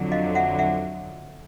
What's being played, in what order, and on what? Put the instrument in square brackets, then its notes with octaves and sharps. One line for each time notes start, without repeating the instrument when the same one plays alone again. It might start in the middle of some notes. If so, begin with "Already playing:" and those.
Already playing: [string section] F2 D3 F#3
[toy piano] D#5 F5
E5 F#5
E5 F#5